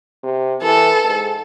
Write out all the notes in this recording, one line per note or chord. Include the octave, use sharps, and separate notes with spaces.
C3
E3 A4
G#2